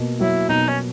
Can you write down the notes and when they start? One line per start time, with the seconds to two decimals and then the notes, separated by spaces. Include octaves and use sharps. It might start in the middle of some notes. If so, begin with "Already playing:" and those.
Already playing: B2 A#3
0.20 F#3 E4
0.49 B2 D#4
0.69 C#4